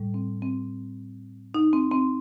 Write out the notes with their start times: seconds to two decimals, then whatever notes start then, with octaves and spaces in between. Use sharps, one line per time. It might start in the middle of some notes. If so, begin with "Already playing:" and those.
Already playing: A2 G3
0.14 C4
0.42 C4
1.54 D#4
1.73 C4
1.91 C4